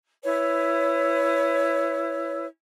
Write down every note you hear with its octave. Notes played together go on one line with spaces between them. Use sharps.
E4 B4 C#5